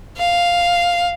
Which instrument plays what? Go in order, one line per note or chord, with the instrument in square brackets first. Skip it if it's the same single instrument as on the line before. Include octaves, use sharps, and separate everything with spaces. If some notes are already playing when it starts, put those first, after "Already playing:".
[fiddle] F5